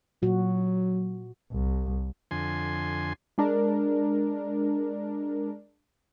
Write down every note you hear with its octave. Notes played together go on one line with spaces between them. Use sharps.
A#2 F#3 F#4
C2
F2 D3 G#5 C6
G#3 D4 A#4